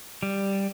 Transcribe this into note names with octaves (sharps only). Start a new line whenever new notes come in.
G3